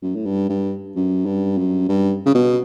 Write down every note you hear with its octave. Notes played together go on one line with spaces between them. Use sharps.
F#2
A2
G2
G2
F#2
G2
F#2
G2
C#3
B2